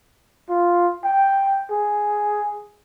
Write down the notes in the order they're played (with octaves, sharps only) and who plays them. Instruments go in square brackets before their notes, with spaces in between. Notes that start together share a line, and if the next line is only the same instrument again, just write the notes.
[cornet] F4
G5
G#4